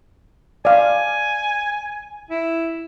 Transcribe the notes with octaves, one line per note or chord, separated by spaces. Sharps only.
D5 F5 G#5
E4